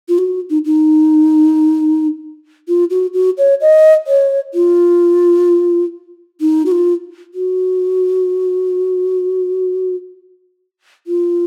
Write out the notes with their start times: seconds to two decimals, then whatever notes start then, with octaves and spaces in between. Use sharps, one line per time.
0.09 F4
0.18 F#4
0.50 D#4
0.66 D#4
2.68 F4
2.90 F#4
3.14 F#4
3.38 C#5
3.61 D#5
4.07 C#5
4.54 F4
6.41 D#4
6.66 F#4
6.72 F4
7.34 F#4
11.07 F4